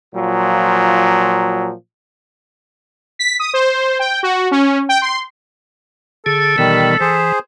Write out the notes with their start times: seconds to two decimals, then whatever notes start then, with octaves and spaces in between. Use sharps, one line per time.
0.15 A#2 F3 F#3
3.19 B6
3.40 D#6
3.54 C5
3.99 G5
4.23 F#4
4.51 C#4
4.89 G5
5.02 C6
6.26 D3 G#4 A4
6.58 B2 D#3 E3 G3 B3
7.01 E3 G#4 C5